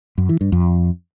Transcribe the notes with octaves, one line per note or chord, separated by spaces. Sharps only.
F#2
E3
G2
F2